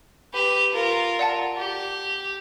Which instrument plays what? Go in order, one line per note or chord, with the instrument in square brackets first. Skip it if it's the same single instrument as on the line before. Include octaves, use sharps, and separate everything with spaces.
[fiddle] G4 B4
F4 A#4
[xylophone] D5 F#5 A5
[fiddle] G4